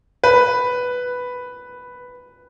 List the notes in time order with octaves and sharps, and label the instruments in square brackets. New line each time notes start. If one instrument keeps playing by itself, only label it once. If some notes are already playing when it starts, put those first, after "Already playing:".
[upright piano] B4